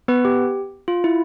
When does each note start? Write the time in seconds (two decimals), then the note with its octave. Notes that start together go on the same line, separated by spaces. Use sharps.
0.08 B3 B4
0.25 G4
0.88 F4
1.04 E4